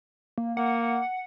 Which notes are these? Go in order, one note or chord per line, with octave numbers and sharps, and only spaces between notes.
A#3
A#3 F#5